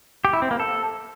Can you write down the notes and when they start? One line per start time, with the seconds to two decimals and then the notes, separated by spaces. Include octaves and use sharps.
0.25 G4
0.33 E4
0.42 C4
0.51 A#3
0.60 A4